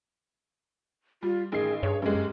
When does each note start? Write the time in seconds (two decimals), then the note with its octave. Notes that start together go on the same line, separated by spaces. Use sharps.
1.23 G3 F4
1.52 A1 D#3 G#4 C7
1.83 G2 G#4 C#5
2.02 F#2 G#3 G4